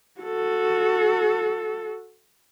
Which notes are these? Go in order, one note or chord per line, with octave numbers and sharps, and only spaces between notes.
F#4 A4